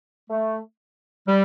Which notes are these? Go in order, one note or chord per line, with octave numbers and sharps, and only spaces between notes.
A3
G3